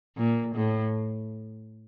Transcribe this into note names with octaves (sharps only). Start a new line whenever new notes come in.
A#2
A2